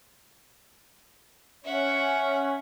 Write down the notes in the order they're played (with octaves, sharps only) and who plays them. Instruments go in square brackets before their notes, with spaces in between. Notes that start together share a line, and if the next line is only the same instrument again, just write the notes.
[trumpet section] C#4 C#5 [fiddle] E5 F#5